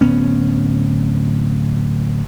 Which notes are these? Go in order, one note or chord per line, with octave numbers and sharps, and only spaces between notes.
D1 B3 C#4